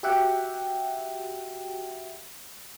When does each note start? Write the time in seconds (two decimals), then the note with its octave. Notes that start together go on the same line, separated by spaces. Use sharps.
0.03 F#4 G4 E5 F#5 G5